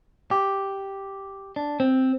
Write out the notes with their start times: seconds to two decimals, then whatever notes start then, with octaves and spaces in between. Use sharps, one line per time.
0.31 G4
1.56 D4
1.80 C4